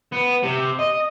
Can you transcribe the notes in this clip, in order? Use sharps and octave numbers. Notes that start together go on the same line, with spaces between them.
B3
C3
D#5